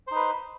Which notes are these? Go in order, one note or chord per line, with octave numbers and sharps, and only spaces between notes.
D#4 B4 C5